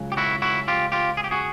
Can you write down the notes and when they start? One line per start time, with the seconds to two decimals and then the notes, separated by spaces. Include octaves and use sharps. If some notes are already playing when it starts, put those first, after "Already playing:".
Already playing: C#2 C#3 F#3
0.12 G4
0.17 E4 F#4
0.42 E4 F#4
0.68 F4 G4
0.92 F4 G4
1.17 G#4
1.24 G4
1.31 F#4 G#4